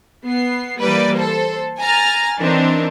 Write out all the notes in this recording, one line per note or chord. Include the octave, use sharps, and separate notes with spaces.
B3 C7
E3 G3 A#3 B4 D5
A4 C5
G#5 A#5 F6 A6
D#3 E3 C4 D4